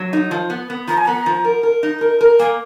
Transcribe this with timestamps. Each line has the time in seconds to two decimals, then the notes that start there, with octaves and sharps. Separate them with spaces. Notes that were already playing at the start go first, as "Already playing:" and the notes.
Already playing: F#3
0.13 D#4
0.31 F3
0.50 B3
0.70 B3
0.87 F3 A#5
0.97 G#5
1.06 B3 A#5
1.26 F3
1.44 A#4
1.63 A#4
1.83 D#4
2.01 A#4
2.21 A#4
2.39 A#3 G#5